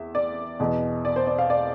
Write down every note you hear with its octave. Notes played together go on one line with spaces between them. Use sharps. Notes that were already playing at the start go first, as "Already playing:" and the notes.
Already playing: E2 E5
D5
E2 B2
D5
C5
D5
F5
D5